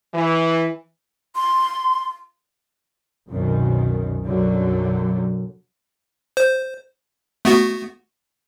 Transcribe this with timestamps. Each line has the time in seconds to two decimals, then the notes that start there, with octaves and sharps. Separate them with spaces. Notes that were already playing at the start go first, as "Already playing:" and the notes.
0.15 E3
1.35 C6
3.30 C2 F#2 B2 D#3
4.23 B1 F#2 D3 F#3 G3
6.37 C5
7.45 A3 B3 F#4